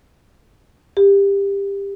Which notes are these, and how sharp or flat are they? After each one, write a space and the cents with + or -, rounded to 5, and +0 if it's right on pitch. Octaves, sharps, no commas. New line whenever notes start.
G4 +20